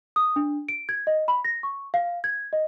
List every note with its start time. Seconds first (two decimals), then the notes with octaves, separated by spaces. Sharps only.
0.16 D#6
0.36 D4
0.69 D7
0.89 G#6
1.07 D#5
1.28 B5
1.45 A#6
1.63 C#6
1.94 F5
2.24 G#6
2.53 D#5